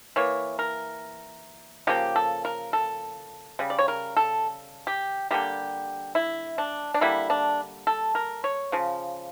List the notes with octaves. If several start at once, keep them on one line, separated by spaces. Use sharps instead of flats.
E3 A#3 C#5
A#4
C#3 F3 A#3 G4
A4
A#4
A4
C#3 G3
D5
C#5
A#4
A4
G4
D3 G3 A#3 G4
E4
D4
D4
D3 G3 A#3 E4
D4
A4
A#4
C#5
C#3 F3